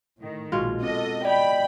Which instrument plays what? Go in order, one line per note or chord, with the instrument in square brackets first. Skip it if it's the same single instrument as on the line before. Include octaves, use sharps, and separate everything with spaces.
[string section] A2 D#3
[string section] A#1 [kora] B2 G#3 F4
[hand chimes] C4 [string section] A4 D#5
[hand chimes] D5 D#5 [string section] G5 B5